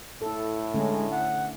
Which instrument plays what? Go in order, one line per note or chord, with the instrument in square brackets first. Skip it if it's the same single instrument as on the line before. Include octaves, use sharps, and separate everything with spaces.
[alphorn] A2 [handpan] E4 A4
[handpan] D3 A3 C#4 [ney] G#3
[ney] F#5